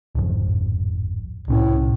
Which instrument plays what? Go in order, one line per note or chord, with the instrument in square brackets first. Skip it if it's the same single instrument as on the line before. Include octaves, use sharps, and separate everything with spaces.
[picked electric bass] D1 G#1 F2
[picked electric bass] C2 C4 C#4 [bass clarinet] A2